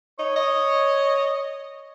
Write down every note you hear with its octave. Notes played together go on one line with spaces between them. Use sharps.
D#4 C#5
D#5